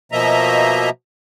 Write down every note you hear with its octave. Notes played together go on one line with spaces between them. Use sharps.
B2 F3 A#3 D#5 E5 A#5